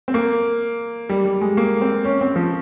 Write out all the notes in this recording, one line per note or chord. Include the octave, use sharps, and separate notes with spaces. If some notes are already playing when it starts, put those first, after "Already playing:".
C4
A#3
G3
G3
G#3
A#3
C4
C#4
C4
F3